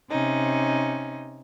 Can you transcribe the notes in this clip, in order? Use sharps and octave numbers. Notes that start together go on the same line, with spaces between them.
C3 C#4 D#4